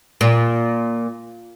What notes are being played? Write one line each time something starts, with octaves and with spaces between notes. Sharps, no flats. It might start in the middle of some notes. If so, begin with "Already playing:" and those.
A#2